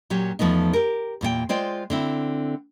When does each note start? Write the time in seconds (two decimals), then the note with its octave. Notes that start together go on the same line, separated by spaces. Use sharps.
0.10 A#2 F#3 C#4 G4
0.39 E2 F3 A3 B3 D#4
0.73 G4 A#4
1.21 E2 A#2 F4 G5
1.49 G#3 F4 C5 D5 G5
1.90 D3 C4 E4